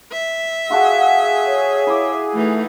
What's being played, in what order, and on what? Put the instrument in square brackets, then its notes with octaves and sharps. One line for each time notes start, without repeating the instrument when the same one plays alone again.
[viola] E5
[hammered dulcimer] F4 F#4 A4 [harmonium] G#4 [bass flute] F#5
[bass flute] C#5
[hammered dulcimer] E4 D6
[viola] E3 D#4 [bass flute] A3